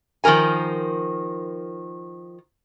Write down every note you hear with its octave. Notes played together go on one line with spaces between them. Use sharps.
D#3 F3 G4 A#4 G#5